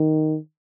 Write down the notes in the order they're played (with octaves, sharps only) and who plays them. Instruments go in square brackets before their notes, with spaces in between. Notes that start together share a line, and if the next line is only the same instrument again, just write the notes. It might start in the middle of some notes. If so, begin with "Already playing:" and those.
Already playing: [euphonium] D#3